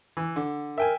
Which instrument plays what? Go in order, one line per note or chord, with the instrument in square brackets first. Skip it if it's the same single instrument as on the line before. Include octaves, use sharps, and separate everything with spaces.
[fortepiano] E3
D3
[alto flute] A#4 [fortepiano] E5 G5 G#5